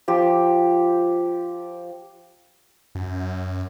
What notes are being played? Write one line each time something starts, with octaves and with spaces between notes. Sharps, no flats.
F3 G4
F#2